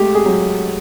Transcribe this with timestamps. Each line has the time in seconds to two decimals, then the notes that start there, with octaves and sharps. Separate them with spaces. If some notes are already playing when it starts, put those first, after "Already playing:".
Already playing: G#3 A3 G4
0.15 G#4
0.26 F#3